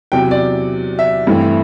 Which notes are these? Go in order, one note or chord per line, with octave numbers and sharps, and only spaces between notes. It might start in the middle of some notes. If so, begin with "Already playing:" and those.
E2 C3 F#3 G5
D5
E5
G2 E3 A3 C4 E4